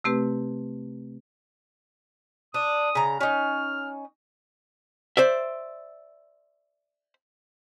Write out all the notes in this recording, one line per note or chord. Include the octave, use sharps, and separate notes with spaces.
C3 A3 C4 G4 B4
D4 D#6
C#3 A#5
C#4 D#4 F6
C5 D5 E5